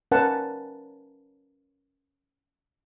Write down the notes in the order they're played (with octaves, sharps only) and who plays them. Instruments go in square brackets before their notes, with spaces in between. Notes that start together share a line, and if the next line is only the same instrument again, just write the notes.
[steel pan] C#4 A#4 B4 F#5 A5